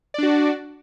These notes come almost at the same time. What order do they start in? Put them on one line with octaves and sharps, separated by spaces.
D5 D4 F#4